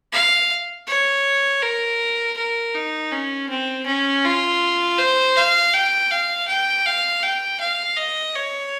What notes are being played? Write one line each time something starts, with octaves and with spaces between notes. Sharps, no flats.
F5
C#5
A#4
A#4
D#4
C#4
C4
C#4
F4
C5
F5
G5
F5
G5
F5
G5
F5
D#5
C#5